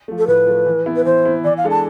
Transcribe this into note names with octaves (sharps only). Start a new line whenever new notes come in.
F3 A3
A4
A2 B4
F3 A3
E3
B3 E4
B4
E3 C5
B3 E4
E3 D5
F5
G#3 D4 A4
A5